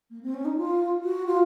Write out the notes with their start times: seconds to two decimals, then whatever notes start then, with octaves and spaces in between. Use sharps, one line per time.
0.10 A#3
0.23 C4
0.34 C#4
0.45 D#4
0.57 F4
1.03 F#4
1.26 F4